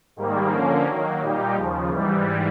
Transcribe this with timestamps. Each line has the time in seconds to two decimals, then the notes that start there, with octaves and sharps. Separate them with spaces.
0.16 G#2 D#3 G3 A#3
0.51 D3 F3 A#3 C#4
0.86 D#3 F#3 A#3
1.20 A#2 G3 A#3 D#4 G4
1.55 D#2 C#3 F3
1.90 G#2 E3 G3